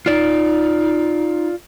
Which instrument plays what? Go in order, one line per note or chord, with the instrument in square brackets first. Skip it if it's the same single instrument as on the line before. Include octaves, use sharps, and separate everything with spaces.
[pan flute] D#4 [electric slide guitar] F4 D5